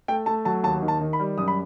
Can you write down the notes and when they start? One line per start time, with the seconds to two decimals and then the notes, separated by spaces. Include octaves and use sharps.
0.08 A3 G5
0.26 A3 A5
0.45 F#3 A5
0.63 D#2 A5
0.82 D#3
0.88 A5
1.01 D#3
1.13 B5
1.20 G3
1.38 F#2 D#6
1.48 B5